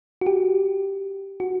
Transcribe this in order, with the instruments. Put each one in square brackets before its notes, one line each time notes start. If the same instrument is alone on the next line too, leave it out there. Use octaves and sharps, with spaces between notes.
[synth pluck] F#4
G4
F#4